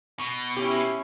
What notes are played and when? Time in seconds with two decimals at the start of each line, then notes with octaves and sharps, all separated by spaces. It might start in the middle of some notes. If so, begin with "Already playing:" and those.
0.19 B2
0.57 C#4 E4 G4